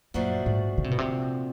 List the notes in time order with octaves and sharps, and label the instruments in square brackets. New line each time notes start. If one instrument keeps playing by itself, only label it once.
[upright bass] F#2 [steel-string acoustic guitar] A#2 F3 A3 D4 F#4
[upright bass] G#2
C#3
C3
B2
C3